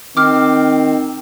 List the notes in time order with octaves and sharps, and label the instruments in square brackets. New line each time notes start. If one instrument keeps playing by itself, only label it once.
[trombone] D#3 [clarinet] C4 [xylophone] D6 F6